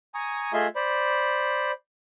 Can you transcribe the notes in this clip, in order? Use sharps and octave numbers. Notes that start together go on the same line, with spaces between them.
G#5 A#5 C#6 D#6
A3 F4 G#4 D#5 E5 C6
C5 D5 B5